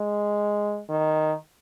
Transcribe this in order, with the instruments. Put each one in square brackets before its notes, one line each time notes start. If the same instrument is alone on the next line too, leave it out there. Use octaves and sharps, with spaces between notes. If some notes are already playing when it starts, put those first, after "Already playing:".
Already playing: [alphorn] G#3
D#3